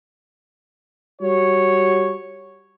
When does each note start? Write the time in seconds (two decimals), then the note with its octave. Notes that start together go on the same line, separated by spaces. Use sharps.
1.21 G3 F#4 C#5